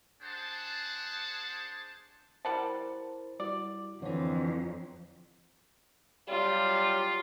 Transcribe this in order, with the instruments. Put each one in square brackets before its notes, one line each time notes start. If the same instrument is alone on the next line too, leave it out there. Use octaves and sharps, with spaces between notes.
[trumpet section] D4 G#4 C5 F#5 A5
[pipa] G3 F#5 A5 [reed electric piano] E4 A#4 C5
[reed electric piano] G3 E4 F#4 [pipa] D5
[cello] F2 [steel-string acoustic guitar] D3 E3 [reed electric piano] F3 C#5
[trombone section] F#3 G3 [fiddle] F4